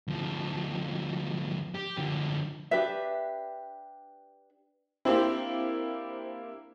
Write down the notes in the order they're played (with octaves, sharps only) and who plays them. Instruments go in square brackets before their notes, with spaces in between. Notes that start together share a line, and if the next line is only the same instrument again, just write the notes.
[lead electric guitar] D2 F3
G4
D3 F3
[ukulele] D4 G4 B4 E5
[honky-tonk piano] A#3 D4 E4 [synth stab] C4 G4